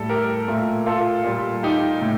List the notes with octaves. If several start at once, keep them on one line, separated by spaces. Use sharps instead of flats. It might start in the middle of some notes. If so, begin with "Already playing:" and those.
Already playing: A2 G3 A4
G4 A#4
A#2 A3
F4 A4
A#2 G3
D#4 G4
A2